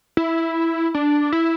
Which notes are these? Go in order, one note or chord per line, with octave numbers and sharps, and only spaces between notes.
E4
D4
E4